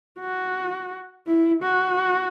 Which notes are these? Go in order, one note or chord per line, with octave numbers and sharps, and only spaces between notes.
F#4
E4
F#4